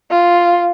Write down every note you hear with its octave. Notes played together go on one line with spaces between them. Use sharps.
F4